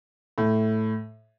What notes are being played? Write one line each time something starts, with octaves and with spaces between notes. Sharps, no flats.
A2